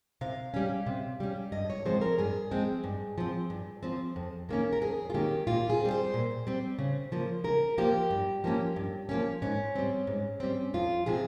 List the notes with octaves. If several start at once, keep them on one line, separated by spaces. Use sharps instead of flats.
C3 F5
G3 C#4
C3
G3 C#4
G2 D#5
C#5
F3 G#3 C4 C5
A#4
G2 G#4
F3 G#3 C4
G2
F3 C4
G2
F3 C4
F2
D#3 A#3 C#4
A#4
F2 G#4
F4
D#3 A#3 C#4 G4
A#2 F4
G#4
G3 C4
C5
A#2
G3 C4
C#3
F3 A#3
C#3 A#4
F3 A#3 G4
G2
F3 A#3 C#4
G2
F3 A#3 C#4
G#2 C#4
G3 C4
G#2
G3 C4
F2 F4
C3 F3 C4 G#4